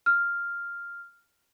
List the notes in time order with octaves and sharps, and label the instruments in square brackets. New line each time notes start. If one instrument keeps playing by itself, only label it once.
[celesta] F6